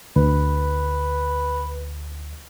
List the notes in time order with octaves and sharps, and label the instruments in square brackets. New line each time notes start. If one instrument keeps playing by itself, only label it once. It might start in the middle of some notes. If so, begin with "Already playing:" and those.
[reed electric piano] D2 [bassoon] B4